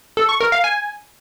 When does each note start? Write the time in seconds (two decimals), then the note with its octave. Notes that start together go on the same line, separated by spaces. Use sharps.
0.17 A4
0.29 C#6
0.40 A#4
0.52 F5
0.64 G#5